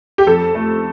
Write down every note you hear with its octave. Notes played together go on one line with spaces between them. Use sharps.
G4
F2 A4
A3